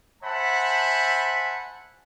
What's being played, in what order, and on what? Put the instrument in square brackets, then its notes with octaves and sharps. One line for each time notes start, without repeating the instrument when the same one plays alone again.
[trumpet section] C5 E5 F#5 G#5 A5 B5